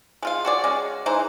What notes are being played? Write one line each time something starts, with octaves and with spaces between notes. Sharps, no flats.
G#3 F4 F5
F#4 G#4 D5
G#3 C#4
E3 G#3 D#4 C5